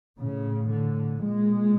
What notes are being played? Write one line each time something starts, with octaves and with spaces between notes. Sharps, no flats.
A2 C#3
D3
A#2 G#3